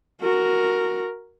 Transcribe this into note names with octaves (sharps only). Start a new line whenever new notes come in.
F#4 A#4